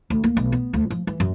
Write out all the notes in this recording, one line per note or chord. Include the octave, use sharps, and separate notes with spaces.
D2
A#3
B1
B3
D2
F3
E3
F#2